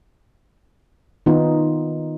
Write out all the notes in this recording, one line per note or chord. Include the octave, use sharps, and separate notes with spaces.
D#3 B3 D#4 F4